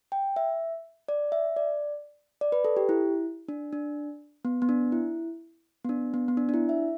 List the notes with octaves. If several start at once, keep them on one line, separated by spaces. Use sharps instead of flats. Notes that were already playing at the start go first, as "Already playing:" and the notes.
G5
E5
D5
E5
D5
D5
B4
A4
G4
E4
D4
D4
B3
B3
D4
E4
B3
D4
B3
B3
D4
D4
E4
E5